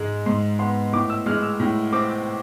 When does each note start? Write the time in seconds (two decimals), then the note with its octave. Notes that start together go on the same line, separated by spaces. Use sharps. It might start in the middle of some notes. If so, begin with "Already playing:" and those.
Already playing: G#2 G#3
0.26 G#2 C6
0.59 B3 C6
0.93 A2 D6
1.10 E6
1.26 G#3 F6
1.43 E6
1.60 A2
1.92 C4 D6